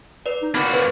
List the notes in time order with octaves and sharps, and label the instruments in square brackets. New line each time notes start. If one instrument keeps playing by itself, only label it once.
[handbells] B4 D5
[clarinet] D#4
[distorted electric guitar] A#3 F#4 [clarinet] C4 [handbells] B5
[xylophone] B4 [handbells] C5